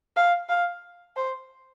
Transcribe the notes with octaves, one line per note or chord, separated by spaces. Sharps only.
F5
F5
C5